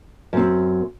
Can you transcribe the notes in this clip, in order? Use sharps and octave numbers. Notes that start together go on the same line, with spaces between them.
F#2 C4